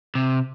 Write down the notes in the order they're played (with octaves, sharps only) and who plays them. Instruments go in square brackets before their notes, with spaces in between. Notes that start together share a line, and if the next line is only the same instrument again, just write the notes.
[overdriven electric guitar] C3